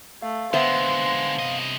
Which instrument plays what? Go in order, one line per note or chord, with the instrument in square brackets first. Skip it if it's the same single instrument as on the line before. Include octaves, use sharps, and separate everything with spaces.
[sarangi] A3 [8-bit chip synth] F5
[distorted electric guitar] D3 G#3 [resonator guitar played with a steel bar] B3 C5 E5 [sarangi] C6
[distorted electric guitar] C3 D#5